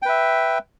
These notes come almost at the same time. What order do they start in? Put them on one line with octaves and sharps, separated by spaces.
G5 B4 E5